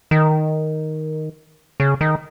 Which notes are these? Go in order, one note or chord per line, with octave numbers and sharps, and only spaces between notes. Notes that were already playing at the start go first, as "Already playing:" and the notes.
D#3
C#3
D#3